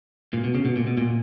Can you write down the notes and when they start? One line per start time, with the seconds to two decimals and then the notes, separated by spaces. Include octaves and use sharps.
0.33 A#2
0.44 B2
0.55 C#3
0.65 B2
0.76 A#2
0.87 B2
0.98 A#2